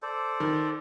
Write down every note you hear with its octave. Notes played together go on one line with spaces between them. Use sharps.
A4 C5 D5
D#3